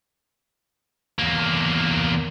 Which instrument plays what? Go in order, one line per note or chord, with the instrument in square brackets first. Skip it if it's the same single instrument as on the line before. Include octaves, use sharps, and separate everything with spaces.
[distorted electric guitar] E2 A#3